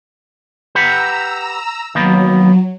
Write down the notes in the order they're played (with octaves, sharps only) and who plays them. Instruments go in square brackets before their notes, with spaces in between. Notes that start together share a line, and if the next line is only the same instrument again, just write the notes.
[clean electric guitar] G4 B4 F#5 [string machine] A#5 E6
[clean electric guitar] D#3 A#3 B3 [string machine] F#3